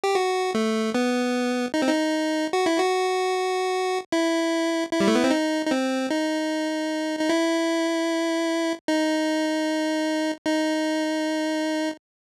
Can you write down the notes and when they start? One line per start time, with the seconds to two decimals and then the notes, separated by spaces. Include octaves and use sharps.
0.04 G4
0.15 F#4
0.55 A3
0.95 B3
1.74 D#4
1.82 C4
1.88 D#4
2.53 F#4
2.66 E4
2.78 F#4
4.12 E4
4.92 E4
5.00 G3
5.08 A3
5.15 B3
5.24 C4
5.31 D#4
5.66 D#4
5.71 C4
6.11 D#4
7.19 D#4
7.29 E4
8.88 D#4
10.47 D#4